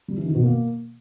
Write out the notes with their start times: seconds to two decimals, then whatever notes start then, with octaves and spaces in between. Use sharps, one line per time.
0.08 G3
0.17 E3
0.26 D#3
0.35 B2
0.43 A#3